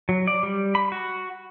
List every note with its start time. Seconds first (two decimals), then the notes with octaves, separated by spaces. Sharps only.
0.09 F#3
0.27 D5
0.43 G3
0.75 B5
0.92 F#4